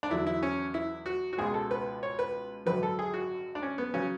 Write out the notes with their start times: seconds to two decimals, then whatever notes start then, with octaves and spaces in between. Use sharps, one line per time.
0.03 D4
0.10 E2 D3 F#3 E4
0.27 E4
0.43 C#4
0.74 E4
1.06 F#4
1.33 F#4
1.38 C#2 B2 G#3 G#4
1.54 A4
1.71 B4
2.03 C#5
2.19 B4
2.66 G#1 F#2 D3 F#3 B4
2.83 A4
2.99 G#4
3.14 F#4
3.55 D4
3.63 C#4
3.78 B3
3.94 C#3 F#3 C#4